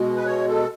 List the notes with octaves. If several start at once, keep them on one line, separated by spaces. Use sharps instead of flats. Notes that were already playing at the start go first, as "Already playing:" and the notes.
Already playing: B2 G#3
B4
C#5
A4